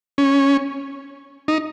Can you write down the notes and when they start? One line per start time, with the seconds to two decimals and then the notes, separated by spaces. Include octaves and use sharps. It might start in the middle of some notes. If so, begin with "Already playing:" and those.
0.18 C#4
1.48 D#4